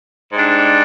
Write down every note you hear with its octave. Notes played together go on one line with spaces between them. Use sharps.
G#2 G3 D4